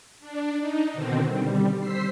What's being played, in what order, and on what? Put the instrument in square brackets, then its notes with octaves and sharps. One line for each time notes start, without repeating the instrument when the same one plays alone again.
[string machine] D4
D#4
B2 D3 D#3 C4
G3
C5 E6 B6 C7